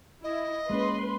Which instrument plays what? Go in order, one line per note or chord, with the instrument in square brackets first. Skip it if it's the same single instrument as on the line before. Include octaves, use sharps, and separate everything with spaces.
[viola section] E4 [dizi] D#5
[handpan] G#3 A#3 C#4 [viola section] B4 C6